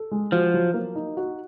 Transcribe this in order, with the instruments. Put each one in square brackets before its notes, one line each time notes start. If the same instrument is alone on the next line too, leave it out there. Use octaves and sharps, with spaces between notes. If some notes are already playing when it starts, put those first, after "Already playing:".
Already playing: [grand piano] A4
G#3
[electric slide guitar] F3 [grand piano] F#4
[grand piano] F#3
A#3
D#4
F#4